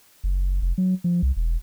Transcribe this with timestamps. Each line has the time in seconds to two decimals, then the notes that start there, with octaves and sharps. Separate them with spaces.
0.24 F#1
0.62 F1
0.78 F#3
1.04 F3
1.22 C2
1.36 E1